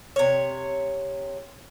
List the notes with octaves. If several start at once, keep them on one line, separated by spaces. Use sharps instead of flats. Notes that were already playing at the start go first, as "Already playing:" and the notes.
C3 C#5